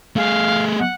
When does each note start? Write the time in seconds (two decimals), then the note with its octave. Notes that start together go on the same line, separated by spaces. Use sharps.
0.16 A3 G#4 F5
0.79 F#5